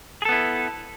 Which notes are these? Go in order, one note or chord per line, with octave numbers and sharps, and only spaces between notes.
B3 E4 G#4 A4